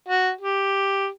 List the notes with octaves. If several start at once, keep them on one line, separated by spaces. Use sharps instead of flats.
F#4
G4